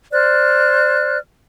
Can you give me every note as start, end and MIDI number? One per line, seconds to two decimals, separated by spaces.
0.12 1.18 72
0.12 1.18 74
0.12 1.18 89
0.12 1.18 90